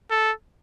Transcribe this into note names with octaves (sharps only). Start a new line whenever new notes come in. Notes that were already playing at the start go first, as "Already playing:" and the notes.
A4